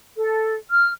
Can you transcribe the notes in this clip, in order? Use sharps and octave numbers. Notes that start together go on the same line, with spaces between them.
A4
F6